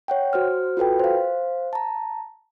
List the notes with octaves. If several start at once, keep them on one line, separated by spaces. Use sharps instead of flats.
C#5 F#5 G5
F#4 C5 F6
F4 F#4 A4 B4 G5
C5 F5
A5 A#5